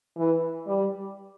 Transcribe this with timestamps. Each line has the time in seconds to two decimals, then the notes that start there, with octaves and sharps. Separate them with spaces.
0.17 E3
0.67 G3